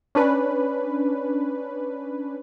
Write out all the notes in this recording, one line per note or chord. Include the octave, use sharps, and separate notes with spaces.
C#4 D4 B4